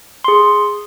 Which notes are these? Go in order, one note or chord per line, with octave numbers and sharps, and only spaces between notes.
G#4 C6